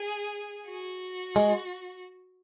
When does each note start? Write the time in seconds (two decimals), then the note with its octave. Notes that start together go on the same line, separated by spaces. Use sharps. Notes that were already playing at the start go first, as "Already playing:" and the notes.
Already playing: G#4
0.69 F#4
1.36 G#3